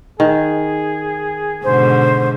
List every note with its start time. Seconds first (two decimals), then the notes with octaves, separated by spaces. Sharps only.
0.20 D#3 G#4
1.64 G#2 B2 D3 C5